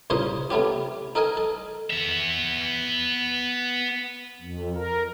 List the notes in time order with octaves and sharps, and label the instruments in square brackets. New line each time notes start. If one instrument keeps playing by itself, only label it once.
[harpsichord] C2 A#2 C#3 D#4 C5 D#5
C3 A3 B3 C#4 G4
D#4 A4 A#4 D#5 G#5
A4
[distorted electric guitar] B3 E5
[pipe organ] F2
A#4